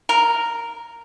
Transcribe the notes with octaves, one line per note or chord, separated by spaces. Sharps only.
A#4